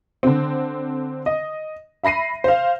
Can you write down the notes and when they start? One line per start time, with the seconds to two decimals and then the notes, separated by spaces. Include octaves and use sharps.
0.23 D3 C4
1.26 D#5
2.03 E5 B5 A#6 C7 D#7
2.44 C5 F5